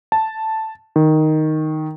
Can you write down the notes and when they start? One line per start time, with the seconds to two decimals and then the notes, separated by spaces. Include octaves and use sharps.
0.12 A5
0.96 D#3